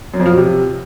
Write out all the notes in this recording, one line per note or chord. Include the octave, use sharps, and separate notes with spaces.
F#2
F2
F3
B2
C3